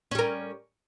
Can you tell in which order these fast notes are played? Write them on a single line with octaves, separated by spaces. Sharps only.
C#4 G3 A#4